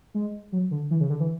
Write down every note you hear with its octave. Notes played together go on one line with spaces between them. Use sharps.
G#3
F#3
D3
E3
C#3
D3
E3